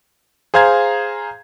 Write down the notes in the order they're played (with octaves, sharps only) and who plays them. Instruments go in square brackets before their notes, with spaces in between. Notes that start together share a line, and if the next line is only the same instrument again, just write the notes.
[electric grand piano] G#4 C5 F5 A#5 G#6